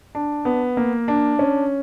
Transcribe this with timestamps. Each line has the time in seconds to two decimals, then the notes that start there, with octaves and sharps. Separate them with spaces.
0.15 D4
0.45 B3
0.77 A#3
1.08 D4
1.39 C#4